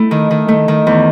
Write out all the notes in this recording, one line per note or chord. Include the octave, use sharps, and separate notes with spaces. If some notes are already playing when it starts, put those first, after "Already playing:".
Already playing: A3 E4
D#3
D#3
A3
D#3
E2